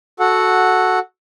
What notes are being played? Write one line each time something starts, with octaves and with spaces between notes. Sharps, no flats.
F#4 A4 F#5